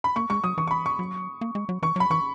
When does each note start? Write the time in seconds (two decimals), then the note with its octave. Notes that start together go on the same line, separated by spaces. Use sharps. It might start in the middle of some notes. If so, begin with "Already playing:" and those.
0.04 B5
0.16 A#3 C#6
0.30 G#3 C#6
0.44 F#3 D#6
0.57 E3 C#6
0.68 C#6
0.71 B5
0.86 C#6
0.99 F#3
1.41 A#3
1.55 G#3
1.69 F#3
1.82 E3 C#6
1.96 F#3 B5
2.10 E3 C#6